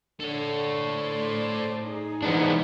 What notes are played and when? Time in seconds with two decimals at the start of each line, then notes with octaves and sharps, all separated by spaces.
0.20 D3 A4 C#5
0.92 A2 C5 D5
1.83 D#4 G#4
2.23 G#2 B2 E3 B3 D4